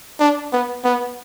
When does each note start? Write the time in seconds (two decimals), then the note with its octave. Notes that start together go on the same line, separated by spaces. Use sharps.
0.19 D4
0.52 B3
0.84 B3